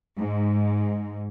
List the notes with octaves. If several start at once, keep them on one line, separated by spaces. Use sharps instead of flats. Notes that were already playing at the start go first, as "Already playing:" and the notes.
G#2